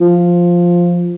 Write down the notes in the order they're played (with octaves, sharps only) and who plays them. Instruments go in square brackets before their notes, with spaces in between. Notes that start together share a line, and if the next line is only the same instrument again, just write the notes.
[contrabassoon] F3